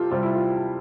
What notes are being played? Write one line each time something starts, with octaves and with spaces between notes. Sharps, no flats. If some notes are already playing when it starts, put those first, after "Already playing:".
Already playing: C3 F4 G4 A4
C3 G3 C4 F4
E4
F4